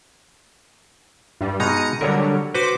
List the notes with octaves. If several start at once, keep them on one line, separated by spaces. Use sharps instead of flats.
G2 G3
B2 G#3 D#4 A#5 D#6 C#7
D3 F#3 G3 A#4 C#5
F#4 B4 C5 D6